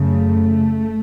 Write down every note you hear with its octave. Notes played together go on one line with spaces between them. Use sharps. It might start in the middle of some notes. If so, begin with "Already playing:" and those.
Already playing: F#2 C#3 A3